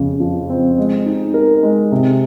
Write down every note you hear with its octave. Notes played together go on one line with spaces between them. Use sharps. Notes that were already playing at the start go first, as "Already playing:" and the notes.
Already playing: F2 C#3
F3
C4
G#3
D#4
A#4
G#3
C3